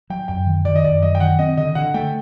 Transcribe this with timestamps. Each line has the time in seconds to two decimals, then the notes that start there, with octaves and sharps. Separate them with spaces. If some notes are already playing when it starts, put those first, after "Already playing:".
0.10 F#3 G5
0.28 F#2 G5
0.47 D#3
0.65 D#3 D5
0.75 D#5
0.84 F#2 D5
1.02 F#3 D#5
1.15 G5
1.20 D#3 F#5
1.39 C4 D#5
1.57 D3 D#5
1.75 D3 F#5
1.94 A3 G5